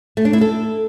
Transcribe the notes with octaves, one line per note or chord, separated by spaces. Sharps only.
A3
D4
E4
A4